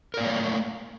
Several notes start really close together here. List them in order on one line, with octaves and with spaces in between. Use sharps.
A#4 D5 A#3 C#5 A3